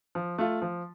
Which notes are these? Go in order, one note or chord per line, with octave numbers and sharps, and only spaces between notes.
F3
A3 F4
F3